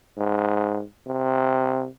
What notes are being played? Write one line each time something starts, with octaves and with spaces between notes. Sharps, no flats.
G#2
C3